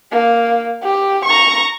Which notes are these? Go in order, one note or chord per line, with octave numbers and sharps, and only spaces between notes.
A#3
G4
A#5 C#6